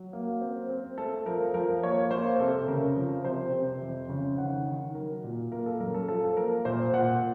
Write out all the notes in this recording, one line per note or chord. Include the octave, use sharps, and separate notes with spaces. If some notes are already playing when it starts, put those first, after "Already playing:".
Already playing: F#3
A#3
C4
C4
A3 A4
F3 A#4
F3 A#4
A#3 C#5
A#3 C5
C3 A4
C#3 A#4
F3
C3 C5
C3
F2
C#3
D#3 F#5
D#3
F#3 A#4
A#2
A#3 A#4
A4
F#2 A#4
A4
F3 A4
A4
A#3 A#4
A#2 C5
A#2 F#5